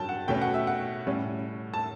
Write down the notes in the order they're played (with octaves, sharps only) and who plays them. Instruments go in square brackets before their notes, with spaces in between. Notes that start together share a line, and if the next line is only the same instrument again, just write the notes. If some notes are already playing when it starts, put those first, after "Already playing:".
Already playing: [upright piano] G2 F#3 C#4 G5 A5
F#5
B2 A3 C#4 G5
F#5
E5
F#5
A2 G3 C#4
A5